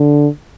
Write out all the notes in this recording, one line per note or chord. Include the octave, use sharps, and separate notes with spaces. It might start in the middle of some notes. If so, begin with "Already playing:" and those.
Already playing: D3